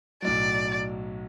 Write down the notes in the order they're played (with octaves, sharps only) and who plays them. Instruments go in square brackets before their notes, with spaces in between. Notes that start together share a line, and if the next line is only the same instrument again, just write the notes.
[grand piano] B1 A2 F#3 [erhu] D5